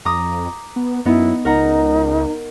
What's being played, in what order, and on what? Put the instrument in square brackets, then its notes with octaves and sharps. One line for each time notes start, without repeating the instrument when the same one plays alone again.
[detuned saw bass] F2 [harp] A#5 D6 D#6
[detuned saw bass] B3
[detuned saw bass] F#2 [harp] B3 D#4 [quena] E4
[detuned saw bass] C#2 [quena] D#4 [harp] A#4 F#5 A#5